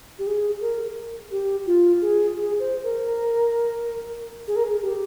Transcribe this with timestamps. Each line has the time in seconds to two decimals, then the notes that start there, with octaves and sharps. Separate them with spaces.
0.19 G4
0.27 G#4
0.61 A#4
1.31 G4
1.67 F4
2.02 G#4
2.37 G#4
2.59 C5
2.84 A#4
4.48 G#4
4.56 A#4
4.64 G#4
4.82 G4